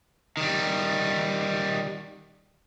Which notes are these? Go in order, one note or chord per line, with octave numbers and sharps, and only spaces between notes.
D#3 G3